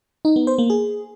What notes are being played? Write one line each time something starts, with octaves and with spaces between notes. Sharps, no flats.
D#4
B3
C5
A#3
G#4